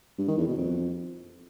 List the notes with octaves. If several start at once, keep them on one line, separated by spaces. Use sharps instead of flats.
G2
D#3
E2
B2
F2